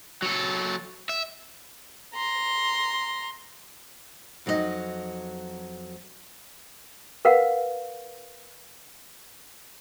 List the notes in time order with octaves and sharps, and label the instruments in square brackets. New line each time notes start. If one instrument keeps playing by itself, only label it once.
[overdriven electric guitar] F#3 A4
E5
[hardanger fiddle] A#5 C6
[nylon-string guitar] F2 F#3 D#4 F4 D#5
[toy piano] A#4 B4 F5 F#5